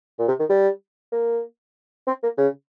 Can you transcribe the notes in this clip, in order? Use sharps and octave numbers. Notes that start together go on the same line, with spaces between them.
A#2
C3
D#3
G3
A#3
C4
A#3
C#3